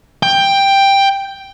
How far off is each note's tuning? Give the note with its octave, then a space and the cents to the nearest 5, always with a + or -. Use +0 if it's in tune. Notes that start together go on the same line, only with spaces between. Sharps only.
G5 +10